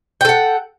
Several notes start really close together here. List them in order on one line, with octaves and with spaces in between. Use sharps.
G5 A4 F#5